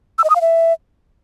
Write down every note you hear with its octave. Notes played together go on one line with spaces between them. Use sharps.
E6
D#5
D#6
F5
E5